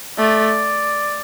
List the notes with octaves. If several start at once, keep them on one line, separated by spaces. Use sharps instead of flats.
A3 D5